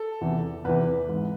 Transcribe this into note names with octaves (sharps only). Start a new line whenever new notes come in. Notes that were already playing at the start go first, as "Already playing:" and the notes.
Already playing: A4
E2 C3 E3
E2 C3 E3 B4
G#2 E3